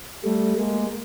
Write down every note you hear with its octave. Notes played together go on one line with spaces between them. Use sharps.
G3 A3
G#3 A#3